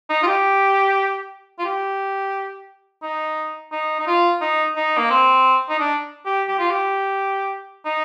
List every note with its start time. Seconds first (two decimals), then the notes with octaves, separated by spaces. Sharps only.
0.10 D#4
0.23 F4
0.27 G4
1.59 F4
1.65 G4
3.02 D#4
3.72 D#4
3.99 D#4
4.07 F4
4.41 D#4
4.76 D#4
4.98 A#3
5.10 C4
5.69 D#4
5.80 D4
6.25 G4
6.48 G4
6.59 F4
6.70 G4
7.85 D#4